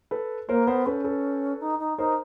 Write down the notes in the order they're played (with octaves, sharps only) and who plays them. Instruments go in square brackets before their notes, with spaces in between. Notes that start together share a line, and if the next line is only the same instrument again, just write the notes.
[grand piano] A4 B4
[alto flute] A#3 [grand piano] A#4 C5
[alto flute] B3 [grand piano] A#4 C5
[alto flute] C#4 [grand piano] A4 B4
[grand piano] A4 B4
[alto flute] D#4
D#4
[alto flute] D#4 [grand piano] A#4 C5